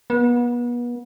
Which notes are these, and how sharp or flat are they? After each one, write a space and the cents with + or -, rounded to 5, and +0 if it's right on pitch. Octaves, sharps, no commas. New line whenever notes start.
B3 -35